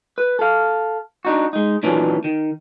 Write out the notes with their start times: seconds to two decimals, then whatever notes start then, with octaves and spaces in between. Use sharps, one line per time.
0.18 B4
0.39 A4 F5
1.25 D4 D#4 F#4
1.53 G#3 D#4
1.83 A#2 D#3 E3 F#3 C#4 D4
2.24 D#3